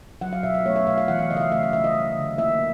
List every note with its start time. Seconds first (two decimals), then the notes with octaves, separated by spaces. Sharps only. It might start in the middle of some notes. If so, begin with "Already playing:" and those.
0.21 F#3 F#5
0.33 F5
0.43 B2 E5
0.54 F5
0.65 A3 C#5
0.76 E5
0.87 B2 F5
0.98 F5
1.08 E3 F#5
1.19 F5
1.30 C#3 D#5
1.37 F5
1.41 E5
1.52 A3 F5
1.63 F5
1.73 C#3 E5
1.84 D#5
1.95 G3
2.17 D3
2.38 A#3 E5